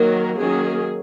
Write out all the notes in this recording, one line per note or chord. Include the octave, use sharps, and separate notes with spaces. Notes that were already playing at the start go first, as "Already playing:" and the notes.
Already playing: D#3 F#3 A#3 A#4
D#3 F#3 A#3 C#4 G#4